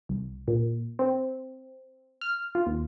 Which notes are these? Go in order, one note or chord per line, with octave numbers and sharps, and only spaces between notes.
C2
A#2
C4
F6
F4
D#2